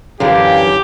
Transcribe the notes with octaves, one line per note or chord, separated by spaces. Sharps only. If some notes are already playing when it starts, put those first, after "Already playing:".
F#2 D3 E3 G4 F5